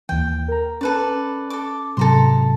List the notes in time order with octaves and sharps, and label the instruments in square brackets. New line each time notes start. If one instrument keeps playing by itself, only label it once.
[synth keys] D#2 E3 [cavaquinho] G5
[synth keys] A#4 A#5
[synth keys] C#4 [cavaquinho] A4 B4 D5
[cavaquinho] A4 D6
[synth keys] G#2 C3 F#3 [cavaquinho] A4 A#5 C6